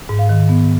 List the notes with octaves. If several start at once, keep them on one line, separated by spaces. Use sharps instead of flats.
G#2
F5
D#3
B3